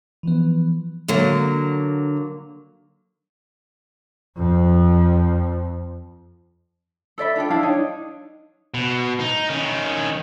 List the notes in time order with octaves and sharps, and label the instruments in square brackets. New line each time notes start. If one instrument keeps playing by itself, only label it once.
[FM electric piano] E3 F3 B3
[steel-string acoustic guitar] D3 F#3 A#3
[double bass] F2 F3
[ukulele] A4 D5 E5 B5
D4 F4 A4 G5
D4 E4 F5 A5
D4 D#4 C#5
[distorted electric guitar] B2
D#4
D#3 C#4